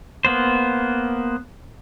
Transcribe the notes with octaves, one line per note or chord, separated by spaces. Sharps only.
A#3 B3 C5